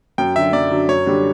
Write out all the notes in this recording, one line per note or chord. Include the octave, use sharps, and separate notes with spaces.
F#2 G5
D3 F#3 E5
F#2 D5
D3 F#3
F#2 C#5
D3 G3 D4 G4